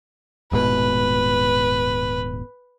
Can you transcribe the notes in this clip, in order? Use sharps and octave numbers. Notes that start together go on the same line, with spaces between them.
D#1 G#2 B2 B4